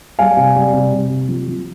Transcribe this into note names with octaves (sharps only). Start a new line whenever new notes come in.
G3 F5 G#5
C3
G3
C3
C3
C3
F3
F3